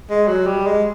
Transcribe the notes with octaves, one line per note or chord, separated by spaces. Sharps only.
G#3
F#3
G3
G#3